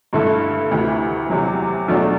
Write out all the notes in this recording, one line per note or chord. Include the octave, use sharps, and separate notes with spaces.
G2 D3 A3 E4 A4
D2 C3 E3
E2 C3 F#3
E2 B2 F#3 A3 D4